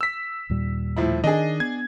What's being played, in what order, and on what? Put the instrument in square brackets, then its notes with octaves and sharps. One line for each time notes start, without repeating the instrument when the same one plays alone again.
[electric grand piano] E6 B6
[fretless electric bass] D#2 A#2 G3
[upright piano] A2 F3 E4
[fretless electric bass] D#3 [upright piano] D4 G#4 [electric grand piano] D#5
[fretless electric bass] B3 [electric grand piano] G#6